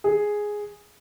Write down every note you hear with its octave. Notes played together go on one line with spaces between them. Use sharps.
G#4